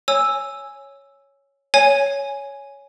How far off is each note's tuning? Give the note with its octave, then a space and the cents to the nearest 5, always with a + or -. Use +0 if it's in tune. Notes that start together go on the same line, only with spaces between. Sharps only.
C#5 +0 G#5 +0 E6 +0
C#5 +10 G#5 +5